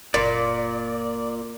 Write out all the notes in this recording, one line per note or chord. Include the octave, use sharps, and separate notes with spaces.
F#1 A#2 D5